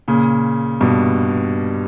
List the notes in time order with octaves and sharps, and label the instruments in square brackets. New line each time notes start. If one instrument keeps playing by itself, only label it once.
[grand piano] A#2 C#3
G2 B2